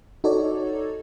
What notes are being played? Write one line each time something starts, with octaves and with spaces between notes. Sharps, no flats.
D#4 F#4 A4 C#5 D5